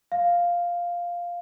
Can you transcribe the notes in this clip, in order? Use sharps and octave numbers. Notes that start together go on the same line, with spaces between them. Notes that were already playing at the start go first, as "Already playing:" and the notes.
F5